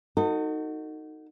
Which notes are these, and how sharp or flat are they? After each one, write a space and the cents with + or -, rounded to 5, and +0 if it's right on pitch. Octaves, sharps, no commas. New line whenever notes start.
D#4 +0 F#4 +0 A4 +45